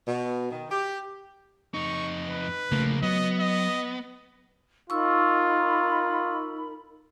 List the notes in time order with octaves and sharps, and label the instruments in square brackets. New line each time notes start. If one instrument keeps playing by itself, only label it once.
[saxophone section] B2
D#3
G4
[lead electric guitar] F2 D#4 [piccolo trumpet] C#6
[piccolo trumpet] B4
[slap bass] C#3 A3 [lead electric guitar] F3 A#3
[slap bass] F#3 [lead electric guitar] B3 [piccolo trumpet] D#5
[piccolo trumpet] D#5
[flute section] D#4 A#4 B5 [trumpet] F4 [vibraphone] C#6 E6